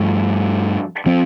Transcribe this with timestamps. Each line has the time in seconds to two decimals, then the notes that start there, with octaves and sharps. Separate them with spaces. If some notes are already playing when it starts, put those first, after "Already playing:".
Already playing: G2 F3 A3
1.06 F3 C4